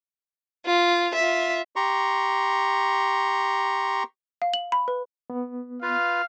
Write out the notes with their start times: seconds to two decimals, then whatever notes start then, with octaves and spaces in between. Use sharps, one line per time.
0.66 F4
1.15 F4 E5
1.76 G4 A#5 C6 C#6
4.42 F5
4.54 F#7
4.72 B5
4.88 B4
5.30 B3
5.82 F4 B4 F5